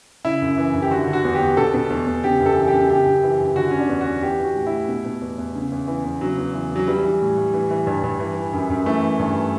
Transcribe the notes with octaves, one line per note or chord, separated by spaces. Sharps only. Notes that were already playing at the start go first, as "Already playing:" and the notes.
C#3 E4
F#2
E3
F#2
G4
D3 F#4
D3
F#4
E2
G4
E2
B2 A4
B2
E2
E2
C#3 G4
F#2
A4
E3
G4
F#2
C#3 G4
F#2
E3
F#2
D3 F#4
D3 C#4
D4
E2
F#4
E2
E3 G4
E3
F#4
A2
E4
A2
B2
B2
E2
E2
C#3
E2
E3
E2
C#3 F#3
E2
E3
E2 F#3
E3 G3
E3
A2
A2
E3
E3
G2
G2
E3
E3
F#2
F#2
E3 A3
E3
G2